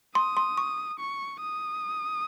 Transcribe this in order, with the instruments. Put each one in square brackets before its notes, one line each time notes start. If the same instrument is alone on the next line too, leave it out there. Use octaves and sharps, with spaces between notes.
[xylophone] C6 [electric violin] D#6
[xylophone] C6
C#6
[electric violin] C#6
D#6